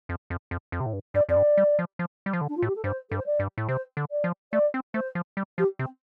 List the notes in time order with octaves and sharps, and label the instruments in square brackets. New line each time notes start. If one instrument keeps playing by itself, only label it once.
[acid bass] F2
F2
F2
F2
C3
A2
G2
[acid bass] G2 [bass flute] D5
[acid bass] F2 [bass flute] D5
[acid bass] G2
G3
F3
F3
G3
F3
D3
[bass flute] D4
F4
[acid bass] A2
[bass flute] G4
A4
[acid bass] G2 [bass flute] C5
[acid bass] G2 [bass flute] A4
[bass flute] C5
D5
[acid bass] G2
A2
[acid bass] C3 [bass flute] C5
[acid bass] D3
[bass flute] D5
[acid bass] F3
[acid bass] A3 [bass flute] D5
[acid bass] C4
[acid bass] A3 [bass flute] C5
[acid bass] F3
G3
[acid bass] F3 [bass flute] G4
[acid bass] C3 [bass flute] C4